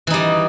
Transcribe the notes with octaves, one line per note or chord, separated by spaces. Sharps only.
E3 G3 D#4